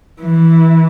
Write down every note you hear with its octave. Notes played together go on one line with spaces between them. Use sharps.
E3